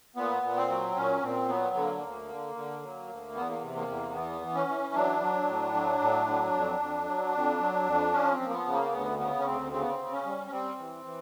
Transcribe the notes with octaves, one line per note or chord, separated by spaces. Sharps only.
A#2 B3
A#2
C4
F#3
A#2 C#4
A#2 C4
F#3 B3
D3 B3
A#3
D2 A#3
D3
D3
F#3
D2
E2 B3
A#3
C3
A#3
E2
E3 B3
E3
C#4
E3
F#3 D4
F#3
A2
F#3
A2
F#3
F2
F2
F#3
F2
F#3
F2
F3 C#4
C4
F3
A#3
B3
C#3
A#3
D2 B3
C#3 B3
C#4
D2 C4
C#3 C4
B3
C4
C#3
C#4
G3
C#4
G3 C4
E3
E3